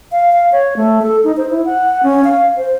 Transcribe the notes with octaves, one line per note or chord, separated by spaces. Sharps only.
F5
F5
C#5
A3
A4
D#4
C5
E4
F#5
C#4
F5
C5